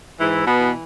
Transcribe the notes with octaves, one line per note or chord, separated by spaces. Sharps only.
G#2 E3 E4
B2 B3
E3